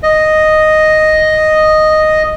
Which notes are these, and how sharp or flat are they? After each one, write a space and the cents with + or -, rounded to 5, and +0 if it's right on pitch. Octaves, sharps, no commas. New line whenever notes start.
D#5 -5